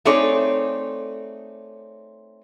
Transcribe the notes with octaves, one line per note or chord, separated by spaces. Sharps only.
A3 C4 D#4 G#4 C#5 D5